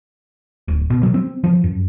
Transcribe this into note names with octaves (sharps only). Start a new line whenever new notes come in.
D1
B2
F#3
C4
F3
F#2